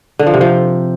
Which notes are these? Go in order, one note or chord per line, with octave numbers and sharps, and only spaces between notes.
D3
F3
C3
F3